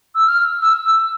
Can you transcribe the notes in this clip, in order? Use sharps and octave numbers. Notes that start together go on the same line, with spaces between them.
E6
F6
E6
E6